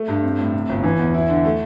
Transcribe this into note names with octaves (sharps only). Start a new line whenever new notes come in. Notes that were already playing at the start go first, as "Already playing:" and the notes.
Already playing: A3
G2
C4
A2
C3
G1
E3
E2
E4
D3
A3